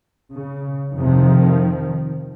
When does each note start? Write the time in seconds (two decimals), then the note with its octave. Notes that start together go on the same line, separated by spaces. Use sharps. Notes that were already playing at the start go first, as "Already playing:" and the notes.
0.31 C#3
0.95 F2 C3 D#3 F3